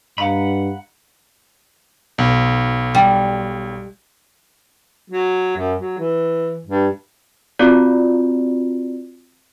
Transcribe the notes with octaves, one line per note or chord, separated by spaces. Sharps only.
G2 D#5 F5 F#5 A#5 B5
B1
G3
F#3
F#2
F#3
E3
G2
C4 F4 F#4 D5